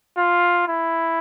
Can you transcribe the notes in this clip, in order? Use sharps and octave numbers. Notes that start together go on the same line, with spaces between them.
F4
E4